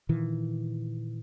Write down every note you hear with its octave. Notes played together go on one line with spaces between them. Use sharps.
A#2 D#3 E3